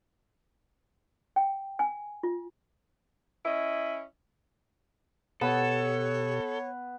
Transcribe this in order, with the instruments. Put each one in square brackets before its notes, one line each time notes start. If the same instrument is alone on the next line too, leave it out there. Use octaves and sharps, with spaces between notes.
[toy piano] G5
G#5
F4
[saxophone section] C#4 E4 D#5
[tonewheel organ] B2 G4 [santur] B3 [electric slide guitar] A4 [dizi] C#5